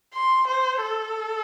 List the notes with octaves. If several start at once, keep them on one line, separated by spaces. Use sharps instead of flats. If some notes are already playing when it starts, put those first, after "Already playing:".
C6
C5
A4